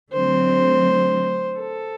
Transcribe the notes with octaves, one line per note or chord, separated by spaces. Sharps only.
D3 F#3 A3 C4 C5
A4